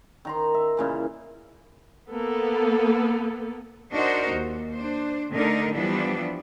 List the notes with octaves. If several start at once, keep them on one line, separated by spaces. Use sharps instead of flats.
D#3 A#5 C6
E5
A#2 C#3 E3
A#3 B3 A4
D4 D#4 F#4 A#4 C5
D#2
D4 C5
D3 A3 D4 D#4 A#4
E3 F3 G3 B3 D4 E4